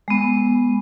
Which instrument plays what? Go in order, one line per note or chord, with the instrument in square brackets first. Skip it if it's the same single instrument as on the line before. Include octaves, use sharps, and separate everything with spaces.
[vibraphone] G#3 B3